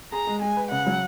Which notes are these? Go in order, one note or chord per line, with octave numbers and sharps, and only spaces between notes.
G#4 A#5
G#3
G#3 G#5
B4
C#3 F#5
F#3